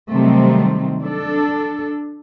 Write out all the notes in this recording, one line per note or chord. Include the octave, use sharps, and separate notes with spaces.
C3 D#3 F#3 G3 A3 C4
D4 A4